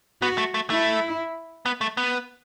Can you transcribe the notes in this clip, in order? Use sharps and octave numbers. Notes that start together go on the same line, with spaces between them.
B3 F#4
A3
A3
A3 E4
B3
A3
B3